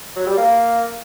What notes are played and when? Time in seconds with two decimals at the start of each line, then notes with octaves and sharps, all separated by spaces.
0.16 F#3
0.27 G3
0.37 A#3